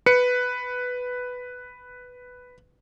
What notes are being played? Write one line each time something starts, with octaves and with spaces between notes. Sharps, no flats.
B4 C#7